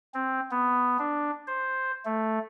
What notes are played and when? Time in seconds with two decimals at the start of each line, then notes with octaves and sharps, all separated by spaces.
0.14 C4
0.51 B3
0.99 D4
1.48 C5
2.05 A3